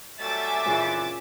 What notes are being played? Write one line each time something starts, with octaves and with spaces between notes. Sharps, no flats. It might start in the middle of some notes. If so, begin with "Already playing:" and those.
F#3 G3 A3 E5 G#5 D6 A6
F2 A#2 C#3 E3 G#4